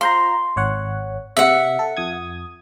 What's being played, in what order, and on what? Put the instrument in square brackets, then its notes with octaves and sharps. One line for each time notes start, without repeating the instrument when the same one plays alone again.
[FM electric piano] F4 C5 A#5 [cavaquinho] C6
[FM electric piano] G#1 C#5 F#5
[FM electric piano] C3 [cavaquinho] E5 F#5
[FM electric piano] A4
F2 D#6 G#6